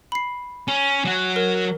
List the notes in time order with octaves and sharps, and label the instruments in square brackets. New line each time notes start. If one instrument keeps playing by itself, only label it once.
[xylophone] B5 C7
[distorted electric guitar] C#4 [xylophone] G#5
[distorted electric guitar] F#3 F#4
[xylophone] A#4